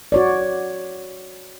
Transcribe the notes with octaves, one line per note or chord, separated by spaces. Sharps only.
F#4 C#5 D5